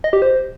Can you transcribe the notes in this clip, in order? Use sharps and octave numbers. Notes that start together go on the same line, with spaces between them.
D#5
G4
C5